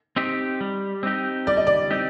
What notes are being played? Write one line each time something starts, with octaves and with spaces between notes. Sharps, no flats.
C4 D#4 G4
G3
C4 D#4 G4
G3 D5
D#5
D5
C4 D#4 G4